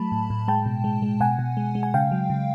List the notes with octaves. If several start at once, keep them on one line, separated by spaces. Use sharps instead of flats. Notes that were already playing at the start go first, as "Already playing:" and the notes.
Already playing: F#3 A3 A5 B5
A2
A2
G#3 G5 A5
B2
G#3
G#3
B2 F#5 G#5
B2
G#3
G#3
G#5
C#3 F5 G5
F#3
C#3